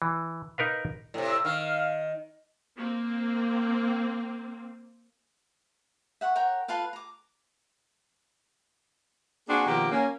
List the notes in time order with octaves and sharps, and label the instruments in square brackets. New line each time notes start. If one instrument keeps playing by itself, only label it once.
[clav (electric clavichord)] E3
D#4 A#4 B4 F5
[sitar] A2 C3
[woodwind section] E6
[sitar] D#3 [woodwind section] F5
[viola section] A#3 C4
[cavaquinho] E5 F#5 C6 C#6
A#4 C#5 F#5 G5
F4 A4 B4 F5
A#5 D6
[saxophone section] A#3 C4 D4 F#4 G#4
B2 D#3 F3 A#3 G4 F#5
A#3 C#4